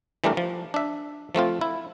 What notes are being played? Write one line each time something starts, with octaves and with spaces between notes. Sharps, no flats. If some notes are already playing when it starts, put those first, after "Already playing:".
E3 G3 A3 D4 A#4
F3
D4 E5
F3 A3 C4 F4
E4